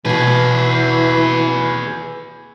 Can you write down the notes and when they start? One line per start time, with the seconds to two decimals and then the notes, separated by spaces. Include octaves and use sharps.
0.05 B2 E3 F#4 G#4 B4